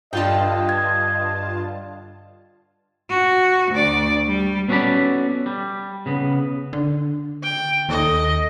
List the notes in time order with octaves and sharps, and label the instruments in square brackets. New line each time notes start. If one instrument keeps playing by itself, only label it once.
[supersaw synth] G2 F4 A5 [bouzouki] D3 G5 [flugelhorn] D#5
[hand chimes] G#6
[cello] F#4
D2 D5
G3
[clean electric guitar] B3 C#4 F#4 A4 D5 B5
G3
C#3 B3
[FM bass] D3
[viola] G5
[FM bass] D#2 [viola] A4 D#5